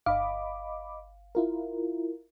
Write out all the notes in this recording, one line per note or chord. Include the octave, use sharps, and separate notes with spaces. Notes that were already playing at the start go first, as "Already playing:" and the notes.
G1 D#5 F5 B5 D6
E4 F4 A#4